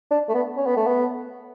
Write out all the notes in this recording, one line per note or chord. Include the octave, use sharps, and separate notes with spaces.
D4
A3
B3
C#4
B3
A3
B3